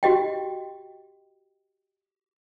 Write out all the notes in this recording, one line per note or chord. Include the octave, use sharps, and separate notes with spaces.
F#4 G4 D#5 G5